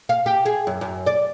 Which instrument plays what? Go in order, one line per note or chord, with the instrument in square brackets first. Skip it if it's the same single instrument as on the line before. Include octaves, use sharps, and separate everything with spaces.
[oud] F5
G4
G#4
F#2
F#2
D5